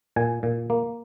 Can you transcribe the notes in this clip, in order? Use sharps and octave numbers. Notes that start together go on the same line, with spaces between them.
A#2 G#5
A#2
A#3